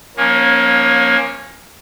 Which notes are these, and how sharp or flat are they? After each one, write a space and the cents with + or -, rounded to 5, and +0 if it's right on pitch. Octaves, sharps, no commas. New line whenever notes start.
F3 +30 A#3 +20 C#4 -10